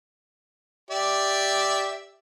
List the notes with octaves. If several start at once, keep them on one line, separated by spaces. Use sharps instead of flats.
G4 D5 E5